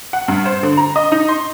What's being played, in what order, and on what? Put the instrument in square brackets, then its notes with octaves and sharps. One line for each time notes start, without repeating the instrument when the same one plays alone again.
[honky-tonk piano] F#5
G2
C5
D3
A#5
D#5
D#4
C6